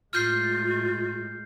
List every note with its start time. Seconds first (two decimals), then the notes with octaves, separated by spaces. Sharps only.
0.13 A2 G#3 F4 F6 G6 C7